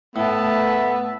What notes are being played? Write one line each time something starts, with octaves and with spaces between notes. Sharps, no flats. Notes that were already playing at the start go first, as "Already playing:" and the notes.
A2 A3 B3 E5 A5